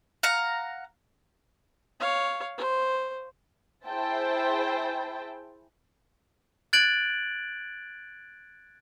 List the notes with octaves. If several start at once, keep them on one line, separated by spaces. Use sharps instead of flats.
F5 F#5 A#5
C#5 F5
C5
E4 G#4 C5 E5 G5 A5
F#6 G#6 A6 D7 F#7